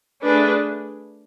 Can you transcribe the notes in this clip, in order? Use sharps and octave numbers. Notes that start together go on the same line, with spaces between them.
A3 D4 G#4 B4